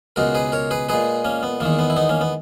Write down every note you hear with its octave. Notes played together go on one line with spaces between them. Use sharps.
C#2 B2 G#3 F#4 A#4
G#4 B4
A#4 C#5
G#4 B4
A#2 G#3 G#4 B4
A#3 C#4
B3
E2 D#3 G#3 A#3
B3
E4
B3 D#4
A#3 C#4
B3